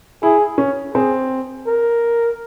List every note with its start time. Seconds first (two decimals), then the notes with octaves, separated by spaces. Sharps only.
0.22 E4 G#4
0.58 C#4
0.94 C4 G#4
1.67 A#4